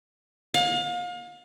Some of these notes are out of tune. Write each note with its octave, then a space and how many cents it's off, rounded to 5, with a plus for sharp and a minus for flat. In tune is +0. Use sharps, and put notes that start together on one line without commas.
F5 +35